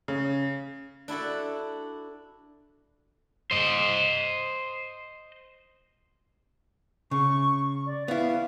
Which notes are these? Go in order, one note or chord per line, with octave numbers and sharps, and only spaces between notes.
C#3
D4 E4 F#4 A4
C5 D#5
C#3 C#6
D5
B3 E4 F5